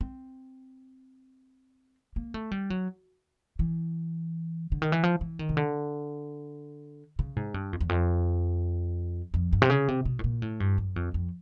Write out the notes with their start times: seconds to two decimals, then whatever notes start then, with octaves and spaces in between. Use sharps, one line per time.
0.01 C4
2.16 A#3
2.34 A3
2.51 G3
2.70 F#3
3.59 E3
4.72 D3
4.82 D#3
4.92 E3
5.03 F3
5.21 E3
5.39 D#3
5.49 C#3
5.57 D3
7.19 C#3
7.36 G#2
7.54 G2
7.73 F2
7.81 E2
7.89 F2
9.34 F2
9.53 G2
9.62 C3
9.70 C#3
9.88 C3
10.05 B2
10.19 A2
10.24 A#2
10.42 A2
10.60 G2
10.78 F#2
10.96 F2
11.14 F2